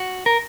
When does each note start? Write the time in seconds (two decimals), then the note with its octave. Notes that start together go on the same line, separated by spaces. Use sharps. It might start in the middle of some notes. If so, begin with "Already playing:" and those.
Already playing: F#4
0.26 A#4